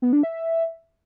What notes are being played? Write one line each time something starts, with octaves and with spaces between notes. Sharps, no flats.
B3
D4
E5